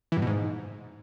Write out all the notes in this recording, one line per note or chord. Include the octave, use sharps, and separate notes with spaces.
E3
G2
B2
G#2